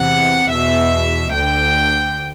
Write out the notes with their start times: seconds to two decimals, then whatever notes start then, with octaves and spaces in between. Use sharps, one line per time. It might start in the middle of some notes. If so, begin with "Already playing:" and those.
Already playing: E2 C3 E3 F#5
0.51 E2 B2 E5
1.34 D2 D3 G5